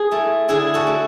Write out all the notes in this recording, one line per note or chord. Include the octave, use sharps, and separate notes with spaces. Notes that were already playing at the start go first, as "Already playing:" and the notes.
Already playing: G#4
A3 E4
D3 E4 G#4
F#4 A4
A3 E4